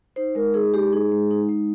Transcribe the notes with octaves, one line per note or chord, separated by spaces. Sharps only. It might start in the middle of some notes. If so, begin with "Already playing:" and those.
D#4 C5
G#3 A#4
D#4 G#4
G#3 G4
D#4 G#4
G#3
D#4
G#3